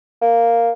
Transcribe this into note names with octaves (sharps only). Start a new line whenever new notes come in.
A#3